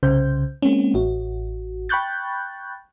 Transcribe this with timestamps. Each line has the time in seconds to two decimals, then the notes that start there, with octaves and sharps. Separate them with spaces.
0.03 C2 C#3 C5 G6
0.62 G#3 A#3 C4 C#4
0.94 A1 F#4
1.89 G5 B5 C#6 F#6 G6 A6